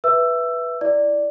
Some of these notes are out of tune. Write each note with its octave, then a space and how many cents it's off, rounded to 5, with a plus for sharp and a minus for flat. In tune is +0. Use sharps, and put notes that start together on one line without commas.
B4 -5 E5 +0 E6 +15
E4 +0 D5 +0